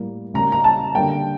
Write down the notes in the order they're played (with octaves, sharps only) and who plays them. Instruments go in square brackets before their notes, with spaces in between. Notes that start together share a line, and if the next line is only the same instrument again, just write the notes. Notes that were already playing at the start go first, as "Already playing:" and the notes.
Already playing: [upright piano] A2 G3 A#3
C#3 G3 A#3 A#5
A#5
A5
D3 G3 A#3 G5